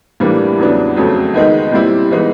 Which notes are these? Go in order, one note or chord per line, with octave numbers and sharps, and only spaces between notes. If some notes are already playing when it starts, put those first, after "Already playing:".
A2 E3 G3 A#3 D4
E2 C#3 F#3 B3 D4
F2 C#3 F#3 A3 C4
D#3 G#3 B3 D#4
A#2 G3 C4 E4
E3 G#3 B3 D#4